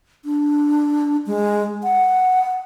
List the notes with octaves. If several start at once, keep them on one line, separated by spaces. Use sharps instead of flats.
D4
G#3
F#5